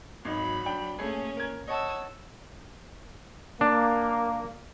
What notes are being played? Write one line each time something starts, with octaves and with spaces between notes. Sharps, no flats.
G#1 F#3 D#4 B5
D4 G5
A3 A#3 C#4 G#4
A#4 G#6
C#5 D#5 F#5 A5 E6
A#3 D4